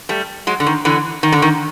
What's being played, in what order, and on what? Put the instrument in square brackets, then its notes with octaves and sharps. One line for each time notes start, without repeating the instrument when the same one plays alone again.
[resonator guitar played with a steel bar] G3 A3
F#3 G#3
D3
D#3
D3 E3
D#3
D3
D#3